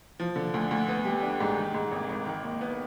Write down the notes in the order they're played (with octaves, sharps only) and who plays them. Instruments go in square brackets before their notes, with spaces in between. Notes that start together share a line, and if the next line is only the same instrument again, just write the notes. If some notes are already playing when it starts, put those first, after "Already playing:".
[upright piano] F3
D3
D2
D2
B3
G3
D4
G#2
D#3
G#2
G#1
G#1
D#3
D#2
B3